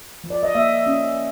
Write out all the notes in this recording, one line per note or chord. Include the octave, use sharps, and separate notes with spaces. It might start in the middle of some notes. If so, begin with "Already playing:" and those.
F3
D5
D#5
A#3 E5
C#4